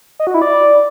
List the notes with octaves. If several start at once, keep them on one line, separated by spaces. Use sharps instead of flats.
D#5
F#4
E4
D5